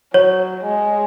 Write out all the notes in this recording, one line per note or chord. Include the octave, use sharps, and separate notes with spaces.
F#3 C#5
G#3